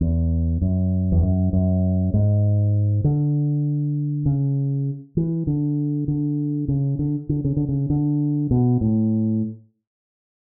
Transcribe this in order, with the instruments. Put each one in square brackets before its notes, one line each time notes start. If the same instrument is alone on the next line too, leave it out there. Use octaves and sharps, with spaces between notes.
[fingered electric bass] E2
F#2
E2
F#2
F#2
G#2
D3
C#3
E3
D3
D3
C#3
D3
D3
C#3
D3
C#3
D3
B2
A2